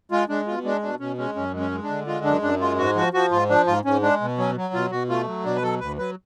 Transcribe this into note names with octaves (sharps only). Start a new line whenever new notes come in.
G#3 F4
G#3 D4
B2 F4
G#3 D4
B2 D4
B2 C#4
G#3 C#4
F#2 C#4
G#3
C#4
G#3
D4
D3
G#3 F4
F#2 D4
F#2 D4
G#3 F4
G#2 F#4
F3 F#4
F3 F#4
G#2 F4
F3 D4
G#2 F4
G#2 C#4
G#3 D4
B2
F#3 C#4
F#3
B2 F4
B2 F#4
A3 F4
F#3
B2 D4
B4
F#3 A4
D2 B4
F#3 B4